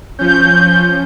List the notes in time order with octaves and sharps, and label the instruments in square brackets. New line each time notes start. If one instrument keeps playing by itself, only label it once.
[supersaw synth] F3 C#4 [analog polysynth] G6